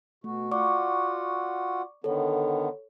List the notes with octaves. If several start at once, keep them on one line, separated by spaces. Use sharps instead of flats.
B2 A3 F#4
F4 F#4 D5 F#5 C#6 D6
D3 D#3 B3 A4 C#5